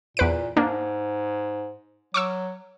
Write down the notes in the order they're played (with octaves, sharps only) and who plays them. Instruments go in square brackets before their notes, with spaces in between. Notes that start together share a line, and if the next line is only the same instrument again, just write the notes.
[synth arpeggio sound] E2 B4 D7 [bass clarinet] A#2
[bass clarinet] G#2 [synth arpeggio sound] A#3 D4
[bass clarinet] F#3 [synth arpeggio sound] C#6 D6 E6